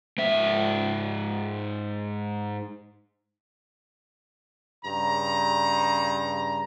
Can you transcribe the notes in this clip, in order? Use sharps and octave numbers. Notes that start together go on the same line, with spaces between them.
G#2 E5
G2 C#3 A#5